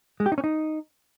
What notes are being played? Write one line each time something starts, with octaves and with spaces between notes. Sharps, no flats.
G#3
G4
D#4
C#4
D#4